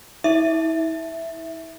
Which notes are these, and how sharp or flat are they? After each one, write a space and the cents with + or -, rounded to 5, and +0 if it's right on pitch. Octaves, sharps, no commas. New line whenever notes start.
E4 -40 E5 +0